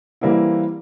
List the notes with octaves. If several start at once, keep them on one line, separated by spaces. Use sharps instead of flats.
E3 G3 A#3 C4 E4